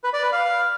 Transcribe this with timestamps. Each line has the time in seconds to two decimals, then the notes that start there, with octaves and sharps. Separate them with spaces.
0.04 B4
0.13 D5
0.23 B4
0.32 F5